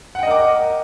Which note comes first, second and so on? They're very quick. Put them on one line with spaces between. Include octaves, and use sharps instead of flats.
F#5 G5 D#5 A#4 D6